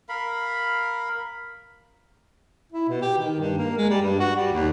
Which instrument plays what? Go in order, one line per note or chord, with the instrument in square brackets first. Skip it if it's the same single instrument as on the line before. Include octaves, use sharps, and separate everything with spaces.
[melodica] A#4 F5 B5
[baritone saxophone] E4
B2
G4
D#3
G2
A#3
G#3
G3
G2
F#4
G3
D#2